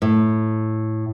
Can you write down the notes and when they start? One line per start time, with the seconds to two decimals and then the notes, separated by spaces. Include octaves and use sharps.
0.02 A2